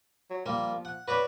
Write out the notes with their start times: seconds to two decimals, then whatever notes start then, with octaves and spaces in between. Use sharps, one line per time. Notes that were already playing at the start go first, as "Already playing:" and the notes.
0.30 F#3
0.46 F3 G3 A#3
0.85 F#5
1.08 F#4 B4 C#5 D5